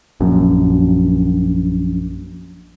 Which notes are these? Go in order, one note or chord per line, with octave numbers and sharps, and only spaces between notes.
A#1 F#2